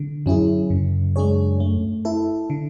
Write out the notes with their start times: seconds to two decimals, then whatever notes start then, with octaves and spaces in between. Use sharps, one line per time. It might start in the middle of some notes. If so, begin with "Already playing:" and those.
Already playing: D3
0.26 F#2 F#3 C#4 E4 G#4
0.70 F#2 C#3
1.16 G#3 D4 G#4 C#5
1.60 A3
2.05 E4 A4
2.50 D3